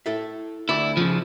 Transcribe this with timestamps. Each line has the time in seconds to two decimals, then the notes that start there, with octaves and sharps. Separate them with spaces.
0.06 E4 A4 E5
0.69 D2 A3 E4 D5
0.97 C#3 F3